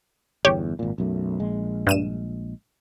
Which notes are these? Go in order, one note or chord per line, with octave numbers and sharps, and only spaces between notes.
G1 E2 G4 C#5
G#1 A#2
B1 F#2 A3
A#1 G#3
G2 D#7 E7